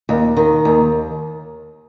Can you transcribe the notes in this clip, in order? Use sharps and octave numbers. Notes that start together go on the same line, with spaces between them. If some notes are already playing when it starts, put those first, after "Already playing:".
D#2
D#3
D#2